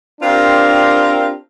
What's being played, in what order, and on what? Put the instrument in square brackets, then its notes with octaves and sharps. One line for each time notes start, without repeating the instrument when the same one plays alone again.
[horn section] C4 D4 F4 G4 A#4